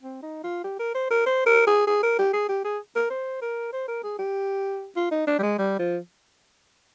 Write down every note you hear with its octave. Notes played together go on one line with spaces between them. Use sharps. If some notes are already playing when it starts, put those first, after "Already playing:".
C4
D#4
F4
G4
A#4
C5
A#4
C5
A#4
G#4
G#4
A#4
G4
G#4
G4
G#4
A#4
C5
A#4
C5
A#4
G#4
G4
F4
D#4
D4
G3
G#3
G3
F3